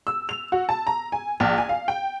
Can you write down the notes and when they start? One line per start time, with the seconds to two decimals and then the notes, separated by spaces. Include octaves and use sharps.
0.07 E6
0.29 F7
0.52 F#4
0.69 A5
0.87 A#5
1.12 G#5
1.40 A#1
1.58 G#5
1.69 F5
1.88 G5